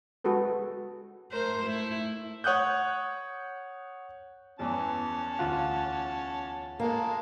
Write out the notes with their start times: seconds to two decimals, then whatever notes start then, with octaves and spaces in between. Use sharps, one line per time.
0.24 G#3 F#4 G#4 A4 B4
1.32 A3 A#4 C5
1.65 A3 E4
2.44 C#5 F#5 D#6 F#6 G6
4.59 E2 E3 C#4 A5
5.39 D2 F4 F#5
6.80 G#3 A#3 A4